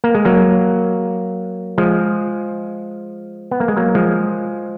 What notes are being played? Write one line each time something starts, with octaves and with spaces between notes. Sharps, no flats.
A#3
G#3
F#3 A#3
F3 G#3
B3
A#3
G#3
F#3 A#3
F3 G#3